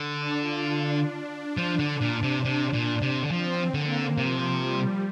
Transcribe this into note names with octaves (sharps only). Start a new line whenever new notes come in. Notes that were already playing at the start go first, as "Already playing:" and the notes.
Already playing: D3
D4
F4
D4
F3
D3
A#2
C3
C3
A#2
C3
D3
F3 C4
D3 A#3
C3 F3
G3